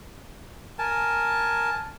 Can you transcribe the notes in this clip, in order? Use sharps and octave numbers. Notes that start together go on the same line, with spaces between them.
A#4 G#5 A5